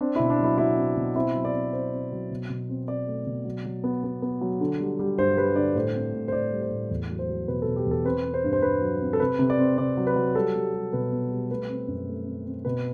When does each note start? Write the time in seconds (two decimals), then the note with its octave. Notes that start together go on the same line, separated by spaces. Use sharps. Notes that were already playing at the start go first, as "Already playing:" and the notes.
0.01 C4 D4
0.16 B2 E4
0.30 D4
0.39 F#3 E4
0.58 F#3 E4
0.77 C4
0.97 B2
1.16 C4 E4
1.34 F#3
1.45 D5
1.53 C4
1.73 C4 C5
1.93 C4
2.12 F#3
2.31 B2
2.50 B2
2.69 C4
2.88 C4 D5
3.07 A3
3.26 B2
3.45 F#3
3.65 F#3
3.84 B3
4.04 B3
4.22 B3
4.41 F#3
4.60 D3
4.80 G3
4.99 G3
5.18 G2 C5
5.37 G3 B4
5.56 D3 D5
5.75 A2 C5
5.95 C4
6.14 A2
6.28 C5
6.32 A2 D5
6.52 G3
6.62 C5
6.71 A2
6.91 E2
7.10 F#3
7.19 C5
7.29 F#3
7.48 B2 B4
7.62 A4
7.67 B2
7.76 G4
7.86 E2 A4
8.05 C4 B4
8.24 C4
8.34 C5
8.44 G2
8.53 C5
8.62 G2 B4
8.81 F#3
9.01 C4
9.13 A4
9.20 C3 B4
9.39 C3
9.50 D5
9.59 C4
9.78 C3 D5
9.97 F#3
10.07 B4
10.16 F#3
10.35 G3 A4
10.55 G3
10.73 G3
10.93 B2 B4
11.12 B3
11.31 G3
11.50 A3 B4
11.70 C4
11.88 F#2
12.08 A3
12.27 C4
12.46 C4
12.65 B2 B4